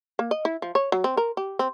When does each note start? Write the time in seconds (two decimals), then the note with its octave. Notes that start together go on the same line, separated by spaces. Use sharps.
0.19 A#3
0.31 D#5
0.45 E4
0.62 F3
0.75 C#5
0.92 F#3
1.04 C4
1.17 A#4
1.37 G4
1.59 C4